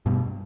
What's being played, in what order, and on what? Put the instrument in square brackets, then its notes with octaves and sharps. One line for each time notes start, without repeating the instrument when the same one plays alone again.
[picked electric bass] G2 B2